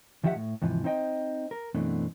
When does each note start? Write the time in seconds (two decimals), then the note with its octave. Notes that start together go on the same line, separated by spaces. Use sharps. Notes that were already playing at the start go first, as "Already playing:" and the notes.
0.24 D2 D#3 F3 G4 E5 F#5
0.35 A2
0.62 D#2 G#2 C3 E3 F3
0.84 C4 D#4 C5 D#5 G5
1.51 A#4
1.74 F#2 B2 E3 A3 C4 D4